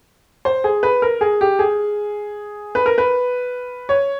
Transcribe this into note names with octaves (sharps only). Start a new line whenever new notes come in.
C5
G#4
B4
A#4
G#4
G4
G#4
B4
A#4
B4
C#5